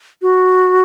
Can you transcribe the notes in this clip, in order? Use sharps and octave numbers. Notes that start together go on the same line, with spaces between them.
F#4